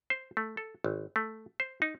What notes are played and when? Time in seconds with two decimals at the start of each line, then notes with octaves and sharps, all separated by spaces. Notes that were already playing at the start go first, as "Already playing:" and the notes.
0.10 C5
0.37 A3
0.57 A4
0.84 G#1
1.16 A3
1.60 C5
1.82 D#4